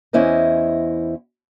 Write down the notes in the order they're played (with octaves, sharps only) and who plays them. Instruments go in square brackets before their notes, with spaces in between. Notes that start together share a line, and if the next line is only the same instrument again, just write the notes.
[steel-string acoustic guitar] E2 C#4 E4 C5 D#5